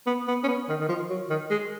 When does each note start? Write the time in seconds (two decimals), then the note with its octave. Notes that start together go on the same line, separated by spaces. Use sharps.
0.07 B3
0.28 B3
0.44 C#4
0.48 B3
0.69 D#3
0.80 D#3
0.89 F3
1.10 F#3
1.30 D#3
1.51 G#3